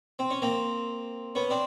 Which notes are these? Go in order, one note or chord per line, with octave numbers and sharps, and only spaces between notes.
C4
C#4
A#3 C4
B3 C#4
C4 D4